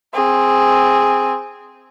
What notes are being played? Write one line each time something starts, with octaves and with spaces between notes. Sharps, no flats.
C4 G#4